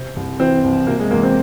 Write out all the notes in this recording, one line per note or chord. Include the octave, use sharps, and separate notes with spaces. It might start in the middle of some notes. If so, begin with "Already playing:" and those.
Already playing: C3 C4
C2
E3 C4
C2
C3 A#3
G#3
E2 A#3
C4